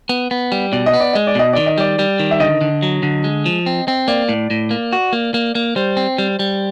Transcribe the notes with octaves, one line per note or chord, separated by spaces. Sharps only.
B3
B3
G3
B2 D5
D#5
B3
D5
G#3 D#5
D5
B2 D#5
D#3 D5
D#5
G3 D5
G3
D#3
E5
D3 D#5
D3
F#3
D3
G#3
F3
C4
C4
A#3 D5
A2
A2
A#3
F#4
A#3
A#3
A#3
G3 C5
C4
G3
G3